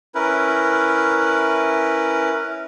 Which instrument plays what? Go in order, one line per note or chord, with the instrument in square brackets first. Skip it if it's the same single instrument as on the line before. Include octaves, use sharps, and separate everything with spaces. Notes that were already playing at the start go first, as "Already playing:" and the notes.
[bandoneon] C#4 E4 A#4 B4